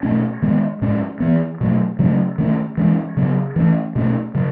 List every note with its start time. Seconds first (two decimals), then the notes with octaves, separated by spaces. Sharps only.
0.03 B2 A3 C#4
0.42 D#3 G#3 B3
0.82 A2 G#3 C#4
1.20 E3 B3
1.61 B2 F#3 A3
1.99 C#3 F#3 A3 C#4
2.38 D#3 A3 C#4
2.77 E3 G#3 C#4
3.17 C#3 F#3 B3
3.56 E3 A3 C#4
3.96 B2 A3 C#4
4.35 C#3 F#3